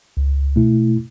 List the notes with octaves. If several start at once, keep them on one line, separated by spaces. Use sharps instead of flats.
C#2
B2 A3 E4